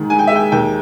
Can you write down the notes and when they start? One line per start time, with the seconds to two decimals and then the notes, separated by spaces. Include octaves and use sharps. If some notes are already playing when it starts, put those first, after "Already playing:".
Already playing: G#2 D#3
0.10 G#2 G#5
0.19 G5
0.27 E5
0.31 G#3 G5
0.52 D#2 G5